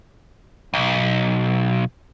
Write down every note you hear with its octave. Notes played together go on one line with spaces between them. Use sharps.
B1